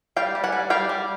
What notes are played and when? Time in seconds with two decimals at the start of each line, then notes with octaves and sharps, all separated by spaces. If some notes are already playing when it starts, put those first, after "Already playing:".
0.17 G3 F5 G5
0.35 G3
0.44 F#5 G#5
0.52 G3
0.70 G3 F5 G5
0.89 G3